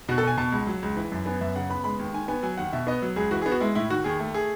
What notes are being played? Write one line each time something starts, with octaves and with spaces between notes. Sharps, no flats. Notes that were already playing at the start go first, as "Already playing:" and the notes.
B2 F#4
A4
B2 G#5
B2 A5
C#2
F#3
C#2
E3
F#2
B3 G#5
F#2 E5
C#3 F#5
B3 B5
G#3 B5
D#2
D#3 G#5
B3 G#5
F#3 G#5
D#2 F#5
B2 E5
B3 D#5
F#3
C#2 G#4
E3 F#4
G#4
B3
F#4
G#3 E4
A2 E4
D#3 F#4
D#2 G#4
A3
G#4